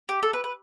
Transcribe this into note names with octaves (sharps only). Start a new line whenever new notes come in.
G4
A4
B4
B4